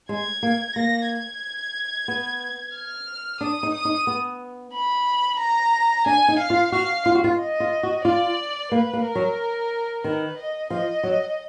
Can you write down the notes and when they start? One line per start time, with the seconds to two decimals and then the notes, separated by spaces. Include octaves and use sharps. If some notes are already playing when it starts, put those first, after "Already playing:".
0.09 G#3 G#6
0.43 A#3
0.76 A#3 A#6
1.08 G#6
2.08 B3
2.75 F6
3.40 D4 D#6
3.63 D#4
3.74 D#6
3.85 D#4
4.07 B3
4.73 B5
5.39 A#5
6.06 D4 G#5
6.28 D#4
6.39 F5
6.50 F4
6.72 F#4 F5
7.06 F4
7.15 F#4
7.24 F4
7.39 D#5
7.60 F4
7.83 F#4
8.05 F4 D5
8.72 A#3 B4
8.93 A#3
9.05 A#4
9.15 F#3
10.03 D#3 B4
10.37 D#5
10.70 F3 D#5
11.03 F#3